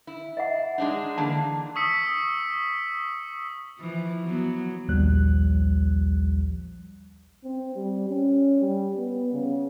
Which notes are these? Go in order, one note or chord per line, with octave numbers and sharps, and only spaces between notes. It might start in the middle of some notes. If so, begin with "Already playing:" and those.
E4
D#5 E5 F#5
G#3 D4 D#4
D3 E3 A#3 A5
C#6 D#6 E6 B6 C#7
E3 F3
F#3 B3
A#1 D#2 F3 G3 F#6
C4
G3
C#4
G3
B3
C#3